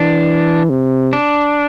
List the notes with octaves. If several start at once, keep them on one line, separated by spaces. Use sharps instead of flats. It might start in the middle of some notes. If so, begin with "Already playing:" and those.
Already playing: E3 D4
C3
D4